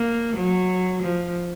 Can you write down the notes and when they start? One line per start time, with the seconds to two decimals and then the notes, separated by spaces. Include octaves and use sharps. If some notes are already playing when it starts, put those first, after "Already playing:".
Already playing: A#3
0.36 F#3
1.02 F3